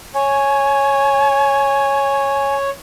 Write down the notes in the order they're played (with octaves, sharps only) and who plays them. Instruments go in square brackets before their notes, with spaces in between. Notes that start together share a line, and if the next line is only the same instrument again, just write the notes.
[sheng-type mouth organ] C#5 [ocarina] G#5